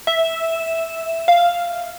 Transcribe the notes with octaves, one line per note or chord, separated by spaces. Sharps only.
E5
F5